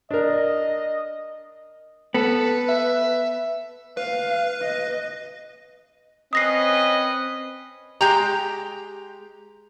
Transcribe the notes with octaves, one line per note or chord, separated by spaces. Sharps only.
D4 A#4 D#5
B3 A4 B4
E5
B4 F5
D#5
C4 C#4 B4 D#5 D#6 A#6 C7
G#3 G4 G5 A#5